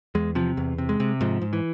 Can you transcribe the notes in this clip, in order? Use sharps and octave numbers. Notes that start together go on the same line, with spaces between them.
E2 G#3
C3 F3
E2
C3
G#3
C3
G#2 F3
G#2
E3